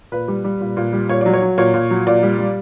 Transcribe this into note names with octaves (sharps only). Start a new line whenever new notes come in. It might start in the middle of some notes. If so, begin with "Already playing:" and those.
A#2 B4
G3
G3
A#2
A#2
G3
A#2 C#5
F#3 D5
C#5
F#3
A#2 C#5
A#2
F#3
A#2 D5
G3
G3